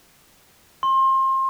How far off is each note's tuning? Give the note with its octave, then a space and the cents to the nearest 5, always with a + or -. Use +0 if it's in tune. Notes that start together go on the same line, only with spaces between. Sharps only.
C6 +30